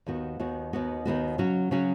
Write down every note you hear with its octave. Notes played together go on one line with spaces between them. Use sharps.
D#2 D#3 B3 F#4
D#2 D#3 B3 F#4
D#2 D#3 B3 F#4
D#2 D#3 B3 F#4
C#3 F#3 C#4 F#4
C#3 F#3 C#4 F#4